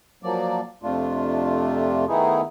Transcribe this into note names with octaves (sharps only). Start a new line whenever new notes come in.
F3 F#3 A#3 D5
F2 C3 A3 D4 F4
D#3 A3 B3 D#4 E4 G#4